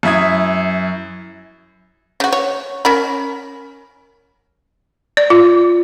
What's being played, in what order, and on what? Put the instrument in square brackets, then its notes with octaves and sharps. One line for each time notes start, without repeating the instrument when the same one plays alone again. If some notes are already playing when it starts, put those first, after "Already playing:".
[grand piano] F#2 E4 E5 D#6 G#6
[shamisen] C#3 F#4
C#5
C#4 A#4 B5
[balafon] D5
F4